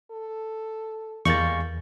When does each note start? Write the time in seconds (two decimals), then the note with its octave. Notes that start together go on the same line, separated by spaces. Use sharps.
0.11 A4
1.25 E2 G3 G#3 A#3 C#6 A6